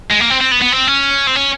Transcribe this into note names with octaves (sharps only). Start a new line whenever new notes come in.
G#3
A#3
C4
C4
B3
B3
C4
C#4
C4
C#4